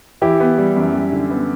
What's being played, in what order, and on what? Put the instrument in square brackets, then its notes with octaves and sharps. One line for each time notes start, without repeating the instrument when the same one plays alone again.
[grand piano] E3 [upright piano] E4 G4
[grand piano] B3
G3
F#2
G3
D3
B3